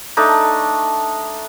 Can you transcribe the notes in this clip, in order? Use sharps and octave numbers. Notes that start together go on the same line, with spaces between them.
A3 D4 D#4